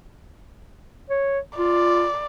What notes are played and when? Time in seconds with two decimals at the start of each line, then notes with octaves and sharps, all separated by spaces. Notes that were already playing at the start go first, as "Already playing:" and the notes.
1.10 C#5
1.58 F4 D5